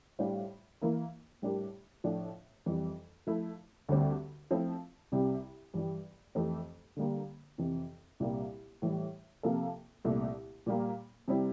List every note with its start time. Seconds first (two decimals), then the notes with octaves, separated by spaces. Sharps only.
0.19 A2 G3 D4 F4 C5
0.81 E3 A#3 E4 A#4
1.42 A2 G3 D4 G4 A#4
2.04 A2 F3 A3 D4
2.66 F2 E3 G3
3.27 F3 A3 E4
3.89 D2 D3 G3 C4 G4
4.51 F3 A3 C4 E4
5.12 C2 C3 G3
5.74 G2 E3 G3
6.35 F2 E3 A3 C4 G4
6.97 D3 G3 A#3
7.58 F2 C3 E3
8.20 C2 A#2 G3 A#3
8.82 A2 E3 G3
9.43 C3 F3 A#3 F4 A4
10.05 C2 A#2 A3
10.66 A#2 G3 A#3
11.28 C3 G3 C4 E4